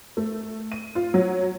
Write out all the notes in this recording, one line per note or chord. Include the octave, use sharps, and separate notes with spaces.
A3
D#7
F4
F#3